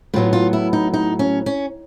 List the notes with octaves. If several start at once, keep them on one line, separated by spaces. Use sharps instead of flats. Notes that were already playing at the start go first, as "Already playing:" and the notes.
A2 F#3 B3 F4
F4
E4
D#4
D#4
C#4
C#4